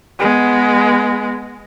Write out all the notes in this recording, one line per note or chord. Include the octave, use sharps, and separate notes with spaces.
G#3 B3